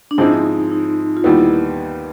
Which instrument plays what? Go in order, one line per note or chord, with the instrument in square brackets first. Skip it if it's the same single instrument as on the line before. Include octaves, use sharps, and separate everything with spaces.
[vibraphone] D4
[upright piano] G#2 F3 G#3 C4 E4 [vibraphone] D#4
[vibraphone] D#4
F4
[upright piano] D#2 D#3 G3 B3 [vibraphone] E4